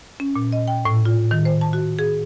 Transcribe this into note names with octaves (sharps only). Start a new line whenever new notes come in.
C#4
A#2
D#5
G5
A2
F4
D#3
C5
A5
F#4
G#4